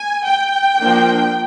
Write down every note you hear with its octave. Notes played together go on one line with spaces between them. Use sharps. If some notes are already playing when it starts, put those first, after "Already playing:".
Already playing: G#5
G5
F3 A#3 D4